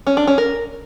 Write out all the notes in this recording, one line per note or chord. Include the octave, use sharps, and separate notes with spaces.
C#4
D4
C#4
A#4